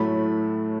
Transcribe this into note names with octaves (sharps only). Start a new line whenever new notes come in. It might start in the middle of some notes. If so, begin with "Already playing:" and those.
Already playing: A2 F#3 A3 B5